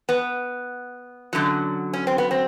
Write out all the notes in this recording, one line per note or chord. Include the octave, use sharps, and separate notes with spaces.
B3
F#2 D3 F#3
C#4
C4
B3
C4